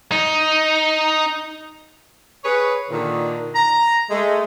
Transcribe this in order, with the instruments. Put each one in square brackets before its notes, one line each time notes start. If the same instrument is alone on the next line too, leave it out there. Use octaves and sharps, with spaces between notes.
[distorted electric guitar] D#4
[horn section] G#4 B4 C#5
A#2 D3 D#3
A#5
G#3 A3